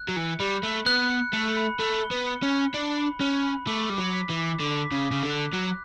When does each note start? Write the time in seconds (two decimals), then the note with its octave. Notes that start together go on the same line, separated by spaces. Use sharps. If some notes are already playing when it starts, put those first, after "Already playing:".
Already playing: F#6
0.09 F#3
0.17 E3 C#7
0.40 G3 B5
0.63 A3 F#6
0.86 B3 F#6
1.10 C#7
1.33 A3 C#7
1.57 B5
1.79 A3 B5
2.03 G7
2.11 B3
2.26 C#7
2.43 C#4
2.51 C#7
2.73 D4 C#7
2.97 B5
3.20 C#4 F#6
3.43 B5
3.67 A3 D6
3.90 G3 D6
3.98 F#3
4.13 B6
4.29 E3
4.37 D6
4.60 D3 D6
4.84 B6
4.91 C#3
5.07 C#3 D6
5.23 D3
5.30 F#6
5.53 F#3 F#6